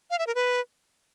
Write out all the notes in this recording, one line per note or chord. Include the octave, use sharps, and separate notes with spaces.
F5
E5
A#4
B4